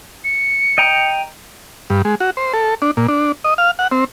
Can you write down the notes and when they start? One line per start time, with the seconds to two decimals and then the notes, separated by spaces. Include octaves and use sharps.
0.24 C#7
0.78 D#5 G5 A#5
1.90 G2
2.05 G#3
2.20 F#4
2.37 C5
2.54 A4
2.82 D4
2.97 A#2
3.08 D4
3.44 D#5
3.58 F5
3.79 F#5
3.91 C4